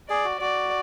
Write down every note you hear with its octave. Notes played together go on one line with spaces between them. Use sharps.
G#4 D5
F#4
F#4 D5